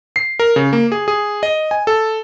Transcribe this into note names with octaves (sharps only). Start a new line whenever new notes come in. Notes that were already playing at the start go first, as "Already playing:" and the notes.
C7
A#4
C#3
A#3
G#4
G#4
D#5
G#5
A4